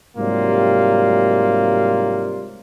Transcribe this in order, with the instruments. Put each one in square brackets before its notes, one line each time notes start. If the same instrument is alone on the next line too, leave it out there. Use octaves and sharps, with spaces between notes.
[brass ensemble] G#2 C3 F#3 G3 A#3 F4